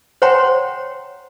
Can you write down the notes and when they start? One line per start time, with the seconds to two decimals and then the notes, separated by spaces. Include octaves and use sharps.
0.22 C5 C#5 F#5 G5 A#5 C6